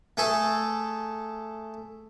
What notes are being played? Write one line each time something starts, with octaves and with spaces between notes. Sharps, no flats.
A3 G#4 A4